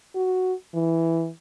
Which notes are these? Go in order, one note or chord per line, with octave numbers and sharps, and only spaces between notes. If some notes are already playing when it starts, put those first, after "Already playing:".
F#4
E3